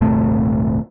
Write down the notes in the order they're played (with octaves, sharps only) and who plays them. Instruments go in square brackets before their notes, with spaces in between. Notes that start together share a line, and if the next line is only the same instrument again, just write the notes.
[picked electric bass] D#1 G#1 C3 A3